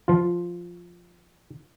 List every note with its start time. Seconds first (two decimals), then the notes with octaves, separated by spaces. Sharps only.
0.08 F3 F4